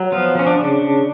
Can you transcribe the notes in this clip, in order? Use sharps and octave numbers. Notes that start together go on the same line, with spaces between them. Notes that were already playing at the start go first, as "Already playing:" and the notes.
Already playing: F#3
F3 B3 F4
F3 C#4
D4
C#3
C#3